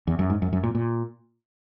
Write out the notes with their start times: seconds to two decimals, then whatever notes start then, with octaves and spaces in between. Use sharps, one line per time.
0.07 E2
0.19 F#2
0.30 G#2
0.42 F#2
0.53 F#2
0.63 A#2
0.75 A#2